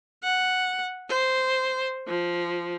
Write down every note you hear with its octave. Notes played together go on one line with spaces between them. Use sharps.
F#5
C5
F3